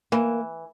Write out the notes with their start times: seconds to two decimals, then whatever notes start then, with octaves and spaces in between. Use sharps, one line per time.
0.12 E3 A#3